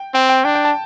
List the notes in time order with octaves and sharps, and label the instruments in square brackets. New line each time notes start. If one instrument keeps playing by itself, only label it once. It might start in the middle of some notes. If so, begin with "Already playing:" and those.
Already playing: [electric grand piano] G5
[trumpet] C4 [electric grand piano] G5
[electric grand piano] G5
[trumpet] D4 [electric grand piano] G5
[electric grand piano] G5
A5